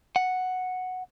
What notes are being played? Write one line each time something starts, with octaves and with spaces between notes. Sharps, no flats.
F#5